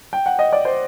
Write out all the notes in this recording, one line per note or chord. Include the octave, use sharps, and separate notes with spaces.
G5
F#5
D#5
D5
C5